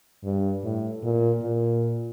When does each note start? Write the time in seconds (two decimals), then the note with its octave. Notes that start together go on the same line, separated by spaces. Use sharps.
0.24 G2
0.63 A2
1.03 A#2
1.42 A#2